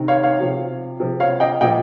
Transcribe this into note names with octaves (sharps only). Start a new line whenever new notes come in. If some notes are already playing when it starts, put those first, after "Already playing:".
Already playing: C3 D#3
C#5 F5
C#5 F5
C3 F3
C3 F3
C#5 F5
D#5 G5
A#2 F3 D#5 G5